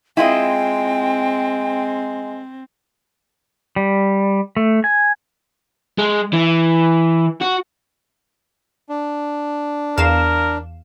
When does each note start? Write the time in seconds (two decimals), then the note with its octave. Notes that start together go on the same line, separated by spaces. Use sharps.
0.17 G#3 C4 E4 F4 D#5 G5
3.76 G3
4.57 A3
4.84 G#5
5.98 G#3
6.33 E3
7.41 F#4
8.89 D4
9.97 E2 A#4 F5 E7